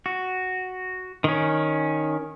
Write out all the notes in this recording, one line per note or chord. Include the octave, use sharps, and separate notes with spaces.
F#4
D#3 C#4